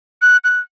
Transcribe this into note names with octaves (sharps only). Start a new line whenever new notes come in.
F#6
F#6